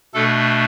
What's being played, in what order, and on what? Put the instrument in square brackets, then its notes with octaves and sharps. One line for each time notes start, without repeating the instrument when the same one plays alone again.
[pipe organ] B2 A3 D4 A4